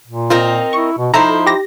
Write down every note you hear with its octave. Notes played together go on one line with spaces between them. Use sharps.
A#2
C4 D#4 F4 A#4
E4 C#6
B2
F3 D#4 E4 A4 C5 A#5
G4 A#6